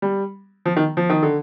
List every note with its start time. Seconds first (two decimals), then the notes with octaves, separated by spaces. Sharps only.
0.02 G3
0.66 F3
0.77 D#3
0.97 F3
1.10 D#3
1.22 D3